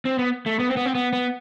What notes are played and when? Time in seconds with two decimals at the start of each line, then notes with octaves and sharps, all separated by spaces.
0.05 C4
0.19 B3
0.46 A3
0.60 B3
0.68 C4
0.77 B3
0.86 C4
0.95 B3
1.13 B3